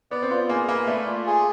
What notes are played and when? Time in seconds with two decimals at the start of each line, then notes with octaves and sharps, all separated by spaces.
0.11 B3 D5
0.22 C4
0.30 B3 F4
0.49 A#3 G#4
0.69 A#3 B4
0.87 A3 D5
1.06 F4
1.26 G#4